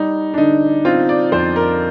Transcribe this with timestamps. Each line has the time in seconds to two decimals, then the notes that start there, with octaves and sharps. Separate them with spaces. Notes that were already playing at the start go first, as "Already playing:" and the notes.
Already playing: G3 D#4
0.34 D4
0.38 D3 D#4
0.85 C4 F4
1.09 D5
1.32 F2 C5
1.56 A#4